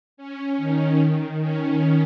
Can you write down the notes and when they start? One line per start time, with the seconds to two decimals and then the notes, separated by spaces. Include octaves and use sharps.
0.17 C#4
0.57 D#3
1.41 C#4